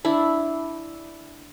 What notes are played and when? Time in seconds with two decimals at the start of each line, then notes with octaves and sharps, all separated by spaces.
0.05 D4 E4